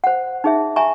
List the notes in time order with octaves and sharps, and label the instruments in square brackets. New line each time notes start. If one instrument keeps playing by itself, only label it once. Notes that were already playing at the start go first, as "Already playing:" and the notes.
[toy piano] C5 F#5
D#4 G#4 E5
E5 G#5 A#5 C#6